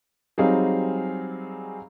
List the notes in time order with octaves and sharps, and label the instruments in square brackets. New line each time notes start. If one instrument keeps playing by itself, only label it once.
[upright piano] F#3 G3 C4 D#4 G#4 F5